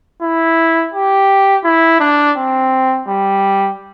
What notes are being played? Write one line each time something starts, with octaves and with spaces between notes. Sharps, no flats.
E4
G4
E4
D4
C4
G3